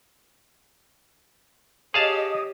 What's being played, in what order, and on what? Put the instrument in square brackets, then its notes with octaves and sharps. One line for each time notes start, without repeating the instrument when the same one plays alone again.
[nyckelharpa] G4 C#5 [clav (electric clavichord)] G#4 F5 A5 [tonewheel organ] D#5